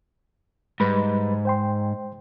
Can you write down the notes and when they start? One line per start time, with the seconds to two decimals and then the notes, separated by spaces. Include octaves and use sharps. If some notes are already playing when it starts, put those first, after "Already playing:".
0.80 G#2 G3 B4 B5
1.45 C5 G5 C6